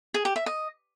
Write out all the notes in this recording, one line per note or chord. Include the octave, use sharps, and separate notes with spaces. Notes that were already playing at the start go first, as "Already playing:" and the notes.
G#4
G4
E5
D#5